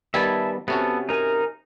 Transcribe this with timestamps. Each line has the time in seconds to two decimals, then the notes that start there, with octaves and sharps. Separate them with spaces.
0.14 D#3 G3 B3 E5 G#5 A5
0.68 C3 B3 C#4 F#4 A4
1.09 D#4 A#4 G#5